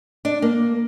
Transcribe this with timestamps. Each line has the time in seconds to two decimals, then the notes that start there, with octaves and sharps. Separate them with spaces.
0.25 D4
0.42 A#3